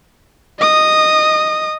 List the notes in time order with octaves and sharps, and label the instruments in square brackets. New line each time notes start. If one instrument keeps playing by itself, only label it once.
[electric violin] D#5 D#6